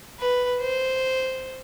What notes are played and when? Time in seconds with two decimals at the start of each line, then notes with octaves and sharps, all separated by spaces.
0.20 B4
0.61 C5